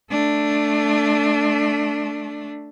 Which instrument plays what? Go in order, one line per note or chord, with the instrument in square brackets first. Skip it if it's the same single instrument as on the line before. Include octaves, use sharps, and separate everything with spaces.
[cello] A3 D4